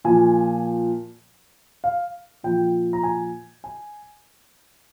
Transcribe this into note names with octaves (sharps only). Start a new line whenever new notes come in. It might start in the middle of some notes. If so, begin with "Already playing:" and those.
A#2 F3 G#5
F5
A#2 F3 G5
A#5
G#5
G#5